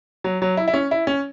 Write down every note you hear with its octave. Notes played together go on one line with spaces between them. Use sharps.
F#3
F#3
E4
E4
C#4
E4
C#4